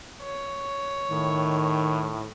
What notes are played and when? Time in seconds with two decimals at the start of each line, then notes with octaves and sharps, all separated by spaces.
0.22 C#5
1.11 A2 D#3